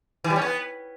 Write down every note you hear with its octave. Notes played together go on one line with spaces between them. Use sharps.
E3
G3
C#4
B3